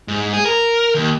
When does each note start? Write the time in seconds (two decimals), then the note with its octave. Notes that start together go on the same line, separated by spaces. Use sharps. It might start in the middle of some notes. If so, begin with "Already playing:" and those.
0.08 G#2
0.33 G#4
0.46 A#4
0.95 D#2